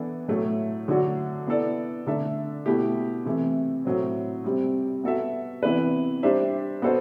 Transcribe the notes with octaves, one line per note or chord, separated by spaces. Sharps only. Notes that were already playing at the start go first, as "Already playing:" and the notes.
Already playing: E3 B3 D4 A4 D5
A2 F#3 A3
D3 F#3 A3 D4 F#4
B3 E4 A4 D5
D3 A3 D4 A4 E5
B2 A3 E4 G4
C3 E3 A3
A2 F#3 C4
C3 G3 C4
B3 F#4 A4 E5
C3 E3 B3 E4 B4
G3 D4 G4 C5 E5
B3 F#4 A4 C5